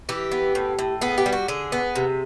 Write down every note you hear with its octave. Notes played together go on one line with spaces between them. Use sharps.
E3 G4
B3
A2
A2
B3 G#4
G4
G3
F#4
D3 G#4
B3
C3